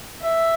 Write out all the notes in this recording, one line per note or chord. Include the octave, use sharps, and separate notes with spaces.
E5